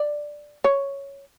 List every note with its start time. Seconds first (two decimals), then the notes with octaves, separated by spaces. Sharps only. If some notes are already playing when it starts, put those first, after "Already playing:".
Already playing: D5
0.64 C#5